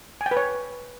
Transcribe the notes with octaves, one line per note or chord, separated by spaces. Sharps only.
G#5
G5
B4
C#5